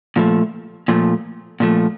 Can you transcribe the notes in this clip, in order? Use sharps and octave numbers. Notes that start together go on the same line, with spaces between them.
A#2 F3 A3
A#2 F3 A3
A#2 F3 A3